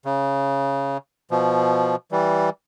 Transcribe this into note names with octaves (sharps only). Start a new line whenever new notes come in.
C#3
B2 F3
E3 G3